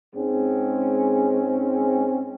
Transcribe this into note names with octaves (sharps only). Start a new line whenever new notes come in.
G#2 G#3 C4 C#4